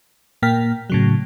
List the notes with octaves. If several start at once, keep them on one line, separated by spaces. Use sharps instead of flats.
A#2 A#3 G5 F6 B6
A2 C#3 F#3